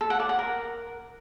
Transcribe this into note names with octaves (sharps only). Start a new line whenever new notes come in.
A4
F#5
D5
F#5
A#4